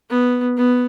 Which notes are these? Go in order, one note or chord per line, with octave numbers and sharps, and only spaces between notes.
B3
B3